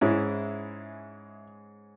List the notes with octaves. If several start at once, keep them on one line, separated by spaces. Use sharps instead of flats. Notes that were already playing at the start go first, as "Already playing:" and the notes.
G#2 G#3 C#4 E4